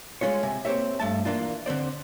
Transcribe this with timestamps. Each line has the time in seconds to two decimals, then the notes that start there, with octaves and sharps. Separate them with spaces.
0.21 G#3 C#4 F4 C#5
0.43 C3 G#5
0.65 A#3 C4 D4 G4 C#5 E5
1.00 G2 A3 A5
1.25 E3 A#3 D4 F4
1.66 D3 C4 C5 D5